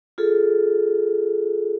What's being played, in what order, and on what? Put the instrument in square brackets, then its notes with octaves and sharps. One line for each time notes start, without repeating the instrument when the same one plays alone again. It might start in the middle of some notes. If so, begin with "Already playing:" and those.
[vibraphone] F4 G#4 A4